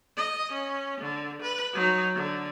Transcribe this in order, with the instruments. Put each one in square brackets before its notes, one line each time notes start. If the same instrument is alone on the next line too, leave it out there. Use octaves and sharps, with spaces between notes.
[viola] D#5
C#4
D3
B4
F#3 D#4
D3